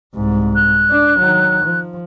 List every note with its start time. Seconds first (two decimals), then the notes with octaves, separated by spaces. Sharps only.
0.15 C2 G#2
0.55 F#6
0.91 D4
1.19 D#3 F#3
1.65 F3